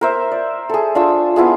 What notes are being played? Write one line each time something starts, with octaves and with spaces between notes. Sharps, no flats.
A#4 C5 E5
D5
G#4 A4
D4 F4 C#6 E6
B3 E4 F4 G#4